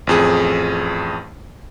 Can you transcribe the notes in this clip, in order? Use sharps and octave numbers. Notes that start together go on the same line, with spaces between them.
A1 F2 G#4